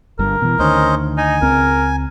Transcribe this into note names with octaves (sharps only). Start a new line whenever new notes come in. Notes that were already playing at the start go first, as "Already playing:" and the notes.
G1 G2 A#4
B2 E3
D2 D#3 C#4 C5 D#5
D#4 G#5
C#2 C4 A#4